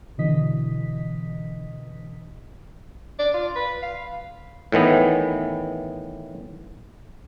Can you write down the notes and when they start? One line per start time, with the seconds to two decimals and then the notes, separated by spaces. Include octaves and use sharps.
0.18 B2 D3 E3 D#5 B6
3.19 D5
3.34 F4
3.56 B4
3.82 F5
4.72 A2 D#3 E3 B3